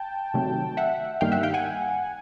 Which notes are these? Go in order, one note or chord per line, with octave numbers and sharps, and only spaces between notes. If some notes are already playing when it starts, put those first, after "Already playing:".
Already playing: G5 A5
C3 D#3 F#3 A3
E5 F#5
G2 D#3 G3 A#3 F5 G5
E5 F#5
F5 G5
F#5 G#5